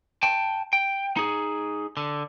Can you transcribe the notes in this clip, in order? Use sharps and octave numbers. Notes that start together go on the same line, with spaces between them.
G5 A5
G5
D#4 G#4
D3